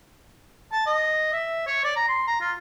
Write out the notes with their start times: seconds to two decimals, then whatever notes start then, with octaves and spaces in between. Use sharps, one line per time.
0.72 A5
0.86 D#5
1.33 E5
1.67 C#5
1.84 D5
1.96 A#5
2.08 C6
2.27 A#5
2.41 F4